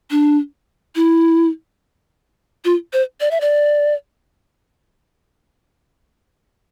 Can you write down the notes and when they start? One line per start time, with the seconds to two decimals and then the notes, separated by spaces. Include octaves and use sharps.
0.11 D4
0.96 E4
2.65 F4
2.93 C5
3.21 D5
3.31 E5
3.41 D5